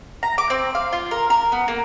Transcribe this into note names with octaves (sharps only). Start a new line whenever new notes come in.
A#5
D6
C4
F5
F4
A#4
A#4
B3
A#3